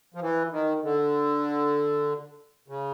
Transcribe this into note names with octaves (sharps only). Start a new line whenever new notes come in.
F3
E3
D#3
D3
C#3